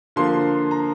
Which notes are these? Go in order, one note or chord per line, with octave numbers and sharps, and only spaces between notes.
D3 F3 A#3 C6
A#5